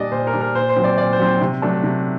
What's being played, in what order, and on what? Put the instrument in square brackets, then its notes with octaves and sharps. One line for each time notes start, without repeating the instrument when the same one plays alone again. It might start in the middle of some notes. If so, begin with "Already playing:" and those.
Already playing: [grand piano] A#2 G3 D4 D5 D#5
A#2 C5
A#4
G3 D4
A#4
A#2 C5
C5
F#3 C4
D5
A#2 D5
C5
F#3 C4
C3
F#3 A3 D4
C3